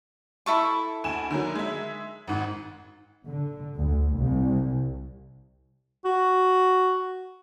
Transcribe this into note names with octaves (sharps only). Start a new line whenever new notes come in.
E4 A4 C#6
D2 G#5 E7
D3 D#3 F#3
G#3 E5
G#1 G#2
D3
D2
C2
F#4